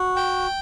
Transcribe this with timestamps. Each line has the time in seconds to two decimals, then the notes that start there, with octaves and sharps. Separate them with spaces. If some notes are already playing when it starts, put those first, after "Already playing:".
Already playing: F#4
0.16 G5